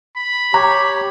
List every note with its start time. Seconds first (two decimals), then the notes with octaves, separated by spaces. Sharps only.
0.17 B5
0.54 G4 C#5 A#5